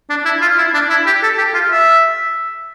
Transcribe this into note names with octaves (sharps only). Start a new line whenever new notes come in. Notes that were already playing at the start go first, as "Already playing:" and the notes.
D4
E4
F4
E4
D4
E4
G4
A4
G4
F4
E5